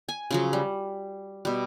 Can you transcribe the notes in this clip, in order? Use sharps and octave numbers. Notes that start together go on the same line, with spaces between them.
G#5
C#3 F3 F#3
G3
B2 G3